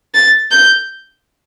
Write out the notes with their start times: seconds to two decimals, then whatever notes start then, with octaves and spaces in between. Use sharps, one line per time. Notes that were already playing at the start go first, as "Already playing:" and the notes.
0.14 A6
0.51 G6